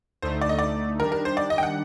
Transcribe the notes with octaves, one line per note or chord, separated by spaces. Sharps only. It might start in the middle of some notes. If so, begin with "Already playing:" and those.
D2 D3 A3 D#4 C5
D5
D#5
D5
D#3 G3 D4 G4 A#4
A#4
C5
D5
D#5
G5
F#5